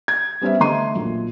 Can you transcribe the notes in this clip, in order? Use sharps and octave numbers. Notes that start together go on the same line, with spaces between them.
G#6
G3 B3 C#4 B4 C5 E5
D3 A3 D#5 C6 D#7
B1 A#2